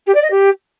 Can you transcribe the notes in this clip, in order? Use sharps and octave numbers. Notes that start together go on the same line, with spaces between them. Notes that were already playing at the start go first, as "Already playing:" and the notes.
G4
D5
D#5
G4